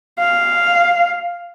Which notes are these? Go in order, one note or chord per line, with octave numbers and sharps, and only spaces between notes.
F5